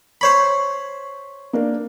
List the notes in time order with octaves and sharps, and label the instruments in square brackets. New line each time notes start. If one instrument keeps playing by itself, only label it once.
[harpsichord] C5 C#5 B5
[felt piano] A#3 D4 A#4